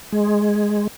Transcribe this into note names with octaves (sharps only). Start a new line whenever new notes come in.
G#3